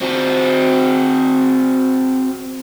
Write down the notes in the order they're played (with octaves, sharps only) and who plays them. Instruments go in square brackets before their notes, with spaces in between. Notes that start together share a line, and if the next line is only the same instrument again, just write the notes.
[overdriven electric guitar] C4 F#4